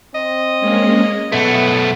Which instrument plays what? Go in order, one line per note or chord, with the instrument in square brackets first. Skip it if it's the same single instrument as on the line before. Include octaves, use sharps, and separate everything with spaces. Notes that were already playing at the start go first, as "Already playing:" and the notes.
[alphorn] C4 [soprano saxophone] D#5
[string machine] G#3 A#3 C#4
[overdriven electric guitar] B1 A3 [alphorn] B3 [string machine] F#5